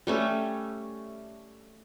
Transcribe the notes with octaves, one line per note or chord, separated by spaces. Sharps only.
G3 A3 C#4